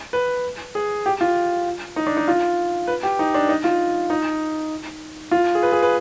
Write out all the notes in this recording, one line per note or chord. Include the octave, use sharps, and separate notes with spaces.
B4
G#4
G4
F4
D#4
D4
D#4
F4
B4
G4
D#4
D4
D#4
F4
D#4
F4
G#4
B4
G#4
B4